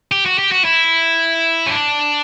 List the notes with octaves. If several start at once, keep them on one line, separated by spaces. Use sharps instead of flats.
G4
F#4
G4
F#4
E4
C#4
D4